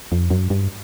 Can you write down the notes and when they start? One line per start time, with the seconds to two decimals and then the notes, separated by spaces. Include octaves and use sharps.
0.12 F2
0.30 F#2
0.50 G2